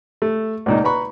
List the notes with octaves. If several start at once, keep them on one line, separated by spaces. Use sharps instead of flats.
A3
C#2 A#2 D#4
B4 A#5 B5 C#6